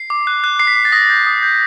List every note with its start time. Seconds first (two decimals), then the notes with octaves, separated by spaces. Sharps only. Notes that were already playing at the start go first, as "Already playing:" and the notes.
Already playing: C7
0.10 D6
0.27 F#6
0.44 F#6
0.59 D6 C7
0.67 B6
0.76 D6 C7
0.85 A6
0.92 D#6 A#6
1.10 G6
1.26 D#6
1.43 G6